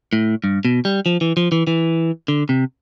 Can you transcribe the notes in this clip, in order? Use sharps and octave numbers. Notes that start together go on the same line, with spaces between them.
A2
G2
B2
G3
F3
E3
F3
E3
E3
D3
C3